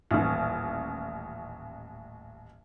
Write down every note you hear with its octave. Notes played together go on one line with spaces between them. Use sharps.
D#1 A1